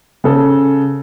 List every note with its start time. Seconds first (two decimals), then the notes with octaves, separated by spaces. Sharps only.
0.24 C#3 A4